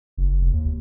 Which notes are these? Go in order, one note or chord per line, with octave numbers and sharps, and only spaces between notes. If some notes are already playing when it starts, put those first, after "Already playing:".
F#1
F1
D#2